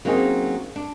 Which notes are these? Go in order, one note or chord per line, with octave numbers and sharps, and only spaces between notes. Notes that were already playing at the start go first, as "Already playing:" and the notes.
F#3 A#3 C4 C#4 D#4 G#4
D4